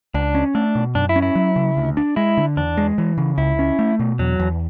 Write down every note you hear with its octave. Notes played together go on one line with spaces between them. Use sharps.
C#2 D4
C#4
A3 D4
B2
F#2 D4
E4
C#4
E4
F#3
C#3
D2
D4
G#3 E4
D3
E2 D4
G#3
E3
C#3
C#2 E4
C#4
A3
B2
E2 F#3
E2